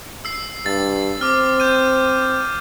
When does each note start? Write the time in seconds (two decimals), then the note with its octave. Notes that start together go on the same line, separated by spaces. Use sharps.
0.25 E6 C7
0.66 G2 A6
1.21 C4 D6 F6
1.60 G6 D#7